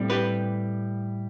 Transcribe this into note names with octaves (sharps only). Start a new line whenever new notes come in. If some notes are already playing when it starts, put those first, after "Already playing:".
Already playing: A2 G3 C4
G4 B4